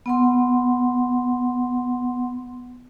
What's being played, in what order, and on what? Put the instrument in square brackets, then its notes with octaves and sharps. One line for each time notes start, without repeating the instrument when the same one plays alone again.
[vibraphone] B3 F#5 C6